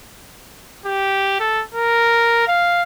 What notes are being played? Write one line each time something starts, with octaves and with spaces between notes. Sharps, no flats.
G4
A4
A#4
F5